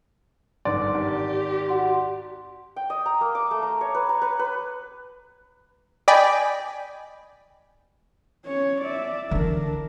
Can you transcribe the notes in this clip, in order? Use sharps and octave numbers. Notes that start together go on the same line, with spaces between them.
G1 G#2 D5 C6
G#1 G4
F#4 F#5 C6
G5
D#5
A#5
A#3
D6
A3
A#5
C#5
B4
A#5
B4
B4
D5 D#5 G5 G#5 B5
C#4 C#5
D5 E5
D3 E3 D4 A#4